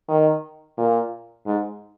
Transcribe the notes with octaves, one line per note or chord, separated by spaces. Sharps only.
D#3
A#2
G#2